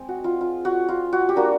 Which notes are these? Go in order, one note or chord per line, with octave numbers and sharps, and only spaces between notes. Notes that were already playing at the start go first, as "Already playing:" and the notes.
Already playing: G#3 C4
F#4
F4
F4
F#4
F4
F#4
G4
A#3 D4 F4 F#4